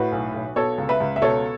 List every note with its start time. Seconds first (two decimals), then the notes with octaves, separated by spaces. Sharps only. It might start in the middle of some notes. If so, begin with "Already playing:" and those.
Already playing: A2 F#4 B4
0.12 B1
0.34 B1
0.56 B2 A4 C#5
0.78 C#2
0.89 B4 E5
1.00 C#2
1.16 E5
1.22 B2 A4 C#5